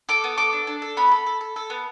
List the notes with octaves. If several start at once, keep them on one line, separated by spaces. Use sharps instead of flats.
A4 D6
B3
A4 D6
D4
D4
A4
B3 B5
A4
A4
A4
A4
B3